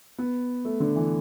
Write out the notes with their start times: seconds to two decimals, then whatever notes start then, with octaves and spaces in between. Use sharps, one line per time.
0.18 B3
0.65 A3
0.80 D3
0.96 E3